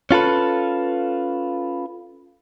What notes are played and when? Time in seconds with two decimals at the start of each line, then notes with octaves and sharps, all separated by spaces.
0.11 C#4 F4 A4 B4